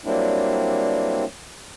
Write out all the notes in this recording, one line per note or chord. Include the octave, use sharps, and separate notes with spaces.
F#3 G3 A#3 C4 D4 E4